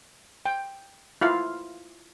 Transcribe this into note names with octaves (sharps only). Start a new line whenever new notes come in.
G5
E4 F4 F5